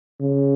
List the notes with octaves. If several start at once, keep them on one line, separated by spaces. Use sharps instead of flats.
C#3